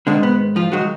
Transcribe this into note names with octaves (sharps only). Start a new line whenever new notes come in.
G#2 D3 D#3 G#3 D4
B3
F3 F4
D#3 F#3 G#3 F#4